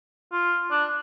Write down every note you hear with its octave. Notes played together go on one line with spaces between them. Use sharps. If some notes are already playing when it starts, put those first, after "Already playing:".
F4
D4